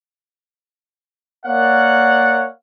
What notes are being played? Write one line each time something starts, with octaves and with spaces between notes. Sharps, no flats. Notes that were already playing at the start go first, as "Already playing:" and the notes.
A#3 A#4 C#5 D5 F5 F#5